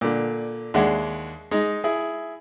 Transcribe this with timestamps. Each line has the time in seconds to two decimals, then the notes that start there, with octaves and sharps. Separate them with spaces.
0.01 A#2 D3
0.74 D#2 G#3 D4 E5 F#5
1.51 G#3 D#4
1.84 E4 G#4